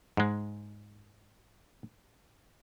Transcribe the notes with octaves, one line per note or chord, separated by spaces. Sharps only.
G#2 G#3